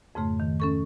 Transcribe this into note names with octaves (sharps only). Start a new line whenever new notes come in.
F2 G#2 C#3 A3
D#3
C#4 A4 C#6